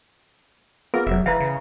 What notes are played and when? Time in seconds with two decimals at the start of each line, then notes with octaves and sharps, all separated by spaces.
0.94 B3 F4 G#4 A#4
1.07 F1 F#3 E5
1.26 E3 E4 B4 E5 F5
1.40 C#3